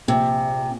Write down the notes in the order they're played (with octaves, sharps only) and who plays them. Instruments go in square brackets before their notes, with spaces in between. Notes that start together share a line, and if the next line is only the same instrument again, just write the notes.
[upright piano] A#1 [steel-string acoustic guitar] C3